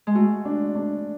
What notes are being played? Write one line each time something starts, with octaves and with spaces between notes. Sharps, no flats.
G#3
A3 F#4
D4
D4